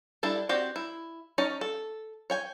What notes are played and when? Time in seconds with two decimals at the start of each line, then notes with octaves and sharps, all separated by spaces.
0.23 G3 D4 E4 A4
0.49 C4 F#4 G4 D5 G5
0.76 E4
1.38 C#4 D#4 C#5 A5
1.61 A4
2.30 C#5 G5 G#5